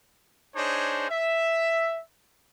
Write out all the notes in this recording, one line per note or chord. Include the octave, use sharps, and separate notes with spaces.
D4 D#4 G#4 C5 C#5
E5